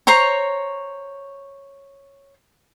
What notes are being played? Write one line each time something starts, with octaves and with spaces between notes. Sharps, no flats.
C5 C#5 A#5 C#6